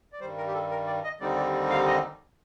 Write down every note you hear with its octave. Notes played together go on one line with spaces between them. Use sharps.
D5
G2 D#3 G3 C5
A#4
G4
A4
A#4
D5
D#5
D#2 D3 G3 C4 D#4 D5
D5
D5
F5
D#5